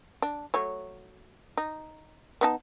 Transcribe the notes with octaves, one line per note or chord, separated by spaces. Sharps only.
D4
F#3 A3 C#5
D#4
B3 D#4 A5